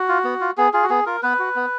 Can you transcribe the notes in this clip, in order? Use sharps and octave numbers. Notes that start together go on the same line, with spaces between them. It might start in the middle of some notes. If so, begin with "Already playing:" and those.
Already playing: F#4
F4
B3
F4
B3 G#4
F4 G#4
F#4
B3 G#4
F4 A#4
B3 B4
F#4
B3